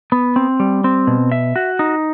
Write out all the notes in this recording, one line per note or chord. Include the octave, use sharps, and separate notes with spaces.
B3
C4
G3
C4
B2
E5
F#4
D#4